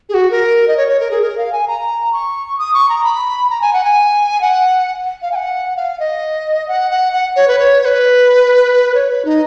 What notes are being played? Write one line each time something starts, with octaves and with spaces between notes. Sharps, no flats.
G#4
F#4
A#4
D#5
C#5
C#5
A#4
G#4
A#4
F5
G#5
A#5
C#6
D#6
C#6
A#5
B5
A#5
G#5
F#5
G#5
F#5
F5
G#5
F#5
F5
D#5
F#5
F#5
F#5
C#5
B4
C#5
C#5
B4
C#5
B4
D#4